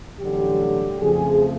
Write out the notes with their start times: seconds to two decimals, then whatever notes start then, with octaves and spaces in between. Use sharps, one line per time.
0.19 A1 G2 D3 F#3 G4
1.00 F2 C#3 F3 A3 G#4